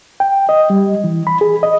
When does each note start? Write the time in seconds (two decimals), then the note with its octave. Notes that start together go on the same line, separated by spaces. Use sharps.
0.20 G5
0.49 D#5
0.70 G3
1.04 E3
1.27 B5
1.41 G#4
1.63 D#5